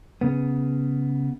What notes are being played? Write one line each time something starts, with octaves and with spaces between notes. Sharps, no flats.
C#3 B3